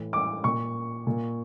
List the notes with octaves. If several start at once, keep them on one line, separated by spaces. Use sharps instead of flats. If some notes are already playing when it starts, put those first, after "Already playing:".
Already playing: A2 E3
D6
A#2 C#6
A#2